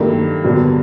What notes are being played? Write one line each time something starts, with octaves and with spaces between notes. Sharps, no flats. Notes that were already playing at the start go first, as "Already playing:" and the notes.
Already playing: G2 D#3 F#3 A3 A#3
G2 D3 F#3 B3